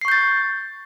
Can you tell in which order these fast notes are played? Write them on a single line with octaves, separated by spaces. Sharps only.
C7 C#6 G6 A6